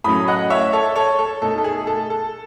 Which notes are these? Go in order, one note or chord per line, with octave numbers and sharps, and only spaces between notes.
A2 F#3 A3 C#4 B5 D#6
D#5 F#5
C#5 E5
A4 C#5
A4 C#5
A4
B2 A3 D#4 A4
A4
G#4
A4
A4